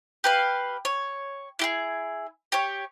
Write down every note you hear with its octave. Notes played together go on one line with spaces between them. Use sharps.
G4 B4 F5
C#5
E4 G4 G#4
G4 C#5